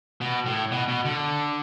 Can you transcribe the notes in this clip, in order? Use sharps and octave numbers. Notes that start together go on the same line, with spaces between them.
B2
A2
B2
B2
D3